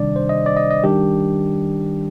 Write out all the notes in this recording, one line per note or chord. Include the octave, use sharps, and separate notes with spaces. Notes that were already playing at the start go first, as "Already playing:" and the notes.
Already playing: C3 D#3 G3 D4 D5
C5
D#5
D5
D#5
D#5
D#3 G3 D4 G4